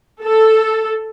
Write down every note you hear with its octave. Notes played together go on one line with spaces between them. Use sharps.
A4